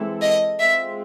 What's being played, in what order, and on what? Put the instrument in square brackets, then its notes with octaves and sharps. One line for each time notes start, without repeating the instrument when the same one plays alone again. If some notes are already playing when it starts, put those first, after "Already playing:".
Already playing: [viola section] E3 G#3 C4 E4 A4
[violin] D#5
[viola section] G#3 C4 F4 [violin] E5